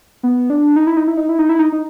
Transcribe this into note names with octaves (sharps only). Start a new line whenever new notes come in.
B3
D4
D#4
E4
D#4
E4
D#4
E4
D#4
E4
D#4
D#4